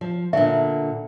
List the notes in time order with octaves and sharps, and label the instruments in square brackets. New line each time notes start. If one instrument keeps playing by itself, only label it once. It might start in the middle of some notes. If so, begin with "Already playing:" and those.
[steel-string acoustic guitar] F3
[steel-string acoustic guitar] A#2 D3 [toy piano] E5